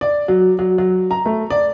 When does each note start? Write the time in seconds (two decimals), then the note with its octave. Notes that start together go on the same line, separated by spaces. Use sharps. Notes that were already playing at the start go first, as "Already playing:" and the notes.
0.01 D5
0.28 F#3
0.59 F#3
0.78 F#3
1.11 A#5
1.26 A3
1.50 D5